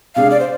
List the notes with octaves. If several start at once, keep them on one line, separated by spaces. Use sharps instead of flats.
C3 G#3 D4 G#4 F5
D5
C5